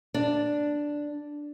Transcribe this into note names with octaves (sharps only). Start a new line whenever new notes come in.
D4